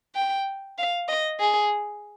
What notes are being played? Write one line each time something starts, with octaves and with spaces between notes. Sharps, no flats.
G5
F5
D#5
G#4